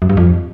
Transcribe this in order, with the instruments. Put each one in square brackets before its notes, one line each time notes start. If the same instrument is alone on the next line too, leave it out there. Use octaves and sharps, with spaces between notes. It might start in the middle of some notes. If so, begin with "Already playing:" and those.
[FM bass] F#2
G2
F2